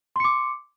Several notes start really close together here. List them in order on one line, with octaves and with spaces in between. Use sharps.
C6 C#7 D6